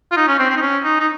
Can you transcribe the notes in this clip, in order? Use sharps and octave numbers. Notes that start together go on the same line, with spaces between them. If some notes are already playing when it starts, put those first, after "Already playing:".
F4
D#4
C#4
C4
C4
D#4
C#4
D#4
D#4